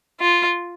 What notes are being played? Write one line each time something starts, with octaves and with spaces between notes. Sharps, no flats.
F4